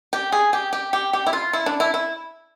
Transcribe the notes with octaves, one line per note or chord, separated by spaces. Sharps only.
G4
G#4
G4
G4
G4
G4
E4
F4
E4
D4
E4
E4